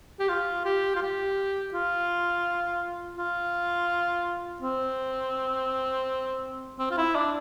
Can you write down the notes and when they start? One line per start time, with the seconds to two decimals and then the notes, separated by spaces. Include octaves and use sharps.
0.20 G4
0.29 F4
0.65 G4
0.96 F4
1.02 G4
1.74 F4
3.18 F4
4.62 C4
6.79 C4
6.91 F4
6.98 E4
7.16 D4